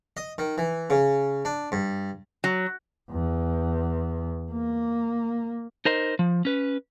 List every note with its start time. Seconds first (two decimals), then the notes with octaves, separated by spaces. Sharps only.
0.17 D#5
0.38 D#3
0.58 E3
0.90 C#3
1.45 D4
1.72 G2
2.44 F#3
3.11 E2
4.52 A#3
5.85 D#4 A#4 C5 D#5
6.19 F3
6.45 C#4 B4